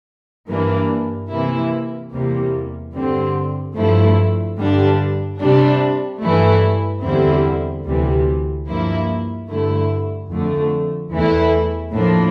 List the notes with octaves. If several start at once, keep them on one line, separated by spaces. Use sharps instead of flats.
G2 E3 A#3 D4
C3 E3 A#3 E4
E2 C3 G3 A#3
G2 D3 G3 C4
G2 F3 A3 E4
G2 D3 G3 D4
C3 G3 D4
G2 E3 A3 E4
E2 D3 G3 C4 E4
D2 C3 E3 G3
G2 F3 A#3 E4
G2 D3 A3 E4
F2 D3 A3
E2 E3 A3 E4
A2 F3 A#3 D4